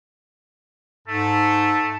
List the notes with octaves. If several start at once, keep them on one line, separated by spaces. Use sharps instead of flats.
G#2 A3 A4